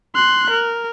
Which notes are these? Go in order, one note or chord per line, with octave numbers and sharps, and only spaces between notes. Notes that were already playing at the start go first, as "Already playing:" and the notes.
C6 F#6
A#4